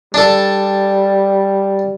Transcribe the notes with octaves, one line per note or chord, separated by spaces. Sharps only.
G3 D4 A4